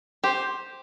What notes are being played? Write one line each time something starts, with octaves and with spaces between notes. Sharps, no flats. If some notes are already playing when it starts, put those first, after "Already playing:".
G4 C5